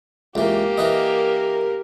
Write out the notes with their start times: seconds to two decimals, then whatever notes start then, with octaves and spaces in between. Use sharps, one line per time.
0.35 C#2 E3 A#3 G4
0.78 E3 A#4 B4 D#5